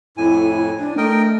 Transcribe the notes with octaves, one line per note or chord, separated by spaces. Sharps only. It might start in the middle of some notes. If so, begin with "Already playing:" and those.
F2 A2 E4 G#5
D4
A3 A#4 D#5 G5